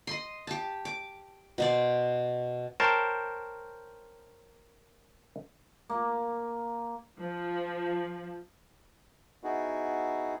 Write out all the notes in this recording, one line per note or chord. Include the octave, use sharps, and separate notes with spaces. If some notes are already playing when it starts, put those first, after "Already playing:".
D#5 C6
G4 A5
D6
B2 C5 D5
A#4 C5 C#5 G5 A5
A#3
F3
B3 D#4 E4 F#4 G#4